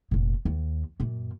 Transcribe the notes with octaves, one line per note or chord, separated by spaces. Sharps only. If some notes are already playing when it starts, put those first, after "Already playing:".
F1 A#2
D#2
F#2 A#2